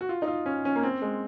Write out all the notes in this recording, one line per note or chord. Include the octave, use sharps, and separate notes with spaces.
F#4
F4
D#4
F4
C#4
C#4
A#3
C4
G#3